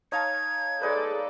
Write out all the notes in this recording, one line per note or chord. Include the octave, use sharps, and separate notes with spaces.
D#4 C#5 F5 A5 G#6
G#3 D#4 G#4 A4 B4 D5